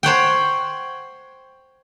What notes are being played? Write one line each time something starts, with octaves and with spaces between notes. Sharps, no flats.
C5 C#5 F#5 G5